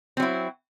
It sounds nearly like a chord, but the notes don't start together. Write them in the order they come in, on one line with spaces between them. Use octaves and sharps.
C4 F#3 E4